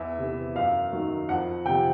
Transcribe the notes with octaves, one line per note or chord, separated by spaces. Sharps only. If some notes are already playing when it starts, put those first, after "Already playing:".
Already playing: E2 E5
C3 E3
F#2 F5
D#3 F#3
F2 F#5
C3 F3 G5